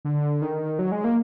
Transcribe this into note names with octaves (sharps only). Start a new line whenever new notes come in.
D3
D#3
F#3
G#3
A#3